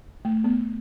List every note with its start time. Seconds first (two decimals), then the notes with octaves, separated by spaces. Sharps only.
0.25 A3
0.44 B3